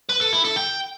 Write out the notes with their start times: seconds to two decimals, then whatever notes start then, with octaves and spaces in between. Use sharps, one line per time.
0.09 B4
0.21 A4
0.33 E4
0.44 A4
0.56 G5